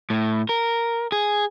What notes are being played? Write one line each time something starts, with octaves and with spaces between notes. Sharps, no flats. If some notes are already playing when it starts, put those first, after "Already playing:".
A2
A#4
G#4